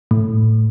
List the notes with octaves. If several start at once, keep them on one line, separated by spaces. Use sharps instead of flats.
A2